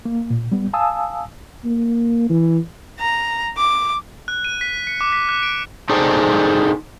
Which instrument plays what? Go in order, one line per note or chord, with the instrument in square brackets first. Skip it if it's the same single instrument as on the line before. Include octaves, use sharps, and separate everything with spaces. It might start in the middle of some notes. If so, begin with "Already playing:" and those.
[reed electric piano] A#3
A#2
G3 B3
F5 G#5 A5 D#6 E6
[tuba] A#3
E3
[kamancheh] A#5
D6
[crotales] F#6
D#7
B6
C#7
D6
B6
F#6
D7
[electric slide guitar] C4 D#4 G#4 A4 C5 D5